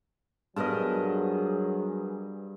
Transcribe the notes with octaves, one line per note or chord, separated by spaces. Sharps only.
G2 F#3 B3 G#4 A#4 D#5 A5